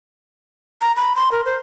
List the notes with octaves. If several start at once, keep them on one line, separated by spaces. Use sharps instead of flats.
A#5
B5
C6
A#4
C5